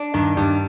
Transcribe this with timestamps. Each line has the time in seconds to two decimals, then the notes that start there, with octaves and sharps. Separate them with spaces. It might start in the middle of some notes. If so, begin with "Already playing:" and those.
Already playing: D4
0.14 G2 D#3
0.37 G2 G3